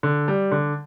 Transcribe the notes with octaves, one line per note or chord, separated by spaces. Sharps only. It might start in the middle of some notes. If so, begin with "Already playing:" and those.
D3
G3
D3